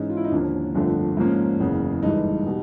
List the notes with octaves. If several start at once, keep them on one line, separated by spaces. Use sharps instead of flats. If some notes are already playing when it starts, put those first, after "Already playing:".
Already playing: G#2 E3 G#3 C#4 D#4
F4
E4
D#4
D#2 D3 F3 A#3 C#4 D4
G1 F2 D3 F3 A3
G#2 F3 A#3 C#4
F#1 E2 C#3
G1 G2 E3 G#3 D#4
B2 G3